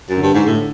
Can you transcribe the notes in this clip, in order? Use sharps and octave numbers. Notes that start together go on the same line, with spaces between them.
F#2
D3
G2
G#2
A2